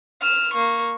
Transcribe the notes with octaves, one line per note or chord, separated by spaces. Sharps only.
F6 E7
A#3 C#6